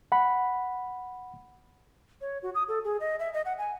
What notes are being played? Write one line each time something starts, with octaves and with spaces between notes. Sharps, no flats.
F#5 B5
C#5
F#4
D#6
A4
G#4
D#5
E5
D#5
F#5
G#5